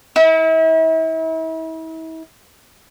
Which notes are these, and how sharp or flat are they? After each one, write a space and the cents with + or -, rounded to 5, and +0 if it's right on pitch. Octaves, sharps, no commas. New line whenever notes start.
E4 -40